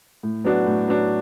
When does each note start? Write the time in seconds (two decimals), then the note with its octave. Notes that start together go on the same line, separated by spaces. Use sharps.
0.23 A2
0.44 F#3 B3 D4 F#4
0.66 A2
0.88 F#3 B3 D4 F#4